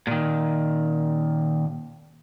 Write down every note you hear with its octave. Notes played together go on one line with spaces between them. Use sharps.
A#2 D#3